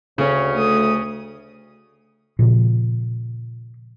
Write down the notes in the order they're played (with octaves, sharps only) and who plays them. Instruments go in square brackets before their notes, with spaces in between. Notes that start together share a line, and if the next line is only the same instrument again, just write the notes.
[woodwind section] D2 [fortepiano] C#3 C#4
[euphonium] A3 [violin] D#6
[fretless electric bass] A#2 C#3 F3